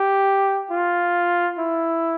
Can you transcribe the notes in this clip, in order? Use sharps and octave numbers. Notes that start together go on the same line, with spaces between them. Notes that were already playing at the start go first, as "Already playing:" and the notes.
Already playing: G4
F4
E4